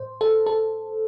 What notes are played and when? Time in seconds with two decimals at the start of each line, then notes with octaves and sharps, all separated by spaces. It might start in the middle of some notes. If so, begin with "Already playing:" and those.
Already playing: A2 C5
0.21 A4
0.47 A4